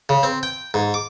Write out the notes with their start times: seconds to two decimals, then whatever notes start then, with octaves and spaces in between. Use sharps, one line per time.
0.09 C#3
0.23 C4
0.43 G5
0.74 G#2
0.94 D6